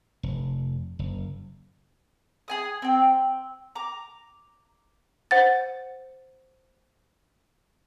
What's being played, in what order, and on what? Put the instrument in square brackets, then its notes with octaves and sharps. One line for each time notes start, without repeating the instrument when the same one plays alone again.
[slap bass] F1
F#1
[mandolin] G#4 G#5 D#6
C4 G5
A#5 D6
[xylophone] C5 F#5 A6